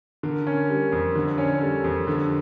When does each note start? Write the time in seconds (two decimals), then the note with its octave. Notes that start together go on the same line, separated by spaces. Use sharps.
0.23 D3 A#4
0.47 C#4
0.70 G3
0.92 F2
1.15 D3
1.27 D5
1.38 C#4 C#5
1.50 A#4
1.61 G3 A4
1.84 F2 G4
2.07 D3 A4